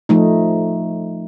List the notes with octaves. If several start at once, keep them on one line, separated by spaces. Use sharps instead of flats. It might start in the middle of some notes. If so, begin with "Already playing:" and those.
F3 A3 D#4